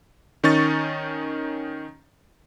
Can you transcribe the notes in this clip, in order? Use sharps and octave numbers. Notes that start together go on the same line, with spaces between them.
D#3 C#4 D#4 C#6 A6